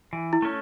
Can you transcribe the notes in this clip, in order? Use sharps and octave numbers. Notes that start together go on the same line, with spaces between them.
E3
E4
A3 C#4